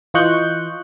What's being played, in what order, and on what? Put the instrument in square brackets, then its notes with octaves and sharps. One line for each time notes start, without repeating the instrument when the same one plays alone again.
[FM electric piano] E3 F4 D#5 C#6 F#6 G6